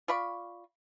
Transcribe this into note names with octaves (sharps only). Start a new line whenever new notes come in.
F4 D5 B5 C#6